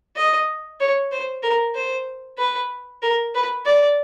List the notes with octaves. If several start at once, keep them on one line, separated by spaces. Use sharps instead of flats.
D#5
C#5
C5
A#4
C5
B4
A#4
B4
D5